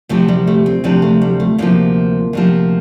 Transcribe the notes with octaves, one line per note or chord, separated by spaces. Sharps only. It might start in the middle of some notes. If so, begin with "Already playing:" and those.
D2 C3 F3 A3
G3
A3
C4
D2 C3 F3 D4
A3
G3
A3
D2 C3 F3 A#3
D2 C3 F3